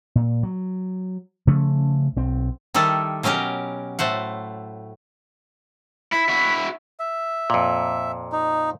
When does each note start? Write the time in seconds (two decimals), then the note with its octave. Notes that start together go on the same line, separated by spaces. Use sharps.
0.15 A#2
0.43 F#3
1.47 C#3 F3 A3 C#4
2.16 B1 C4
2.74 D#3 G3 E4 A4
3.23 B2 F#3 C#4 G4 A#4
3.99 A2 A3 C5 F#5
6.12 E4 B6
6.28 E4 F#4
7.00 E5
7.50 F2 A#2
8.32 D#4